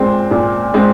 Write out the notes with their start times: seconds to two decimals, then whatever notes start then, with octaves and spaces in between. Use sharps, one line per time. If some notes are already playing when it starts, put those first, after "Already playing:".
Already playing: A#2 G#3 C4
0.31 A#2
0.74 G#3 C4